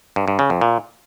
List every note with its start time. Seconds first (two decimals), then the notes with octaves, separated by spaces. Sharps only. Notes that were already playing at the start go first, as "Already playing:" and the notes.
0.16 G2
0.28 G2
0.39 C#3
0.50 F2
0.61 A#2